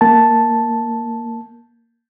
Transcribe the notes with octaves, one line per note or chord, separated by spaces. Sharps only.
A#3 A5